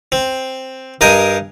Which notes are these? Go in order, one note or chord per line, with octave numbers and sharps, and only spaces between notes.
C4
G2 A#4 D#5 G5 G#5